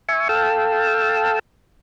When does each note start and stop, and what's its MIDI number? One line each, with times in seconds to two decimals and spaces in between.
0.09 0.28 76
0.09 0.28 80
0.09 0.28 85
0.29 1.39 69
0.29 1.39 77
0.29 1.39 79
0.29 1.39 81
0.29 1.39 88